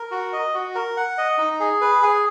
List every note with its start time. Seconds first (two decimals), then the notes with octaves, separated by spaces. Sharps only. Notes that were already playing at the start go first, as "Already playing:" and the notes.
Already playing: A#4
0.11 F#4
0.33 D#5
0.54 F#4
0.75 A#4
0.97 F#5
1.18 D#5
1.38 D#4
1.60 G#4
1.81 B4
2.02 G#4